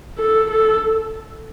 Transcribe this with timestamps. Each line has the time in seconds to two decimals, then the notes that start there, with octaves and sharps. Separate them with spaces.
0.18 A4
0.50 A4